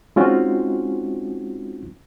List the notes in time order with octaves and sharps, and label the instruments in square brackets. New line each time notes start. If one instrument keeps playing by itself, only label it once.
[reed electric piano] G#3 C4 C#4 D#4 F4 F#4